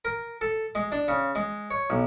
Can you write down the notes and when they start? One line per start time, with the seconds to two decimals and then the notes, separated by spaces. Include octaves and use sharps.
0.05 A#4
0.41 A4
0.75 G#3
0.92 D4
1.08 C#3
1.35 G#3
1.71 C#5
1.90 B1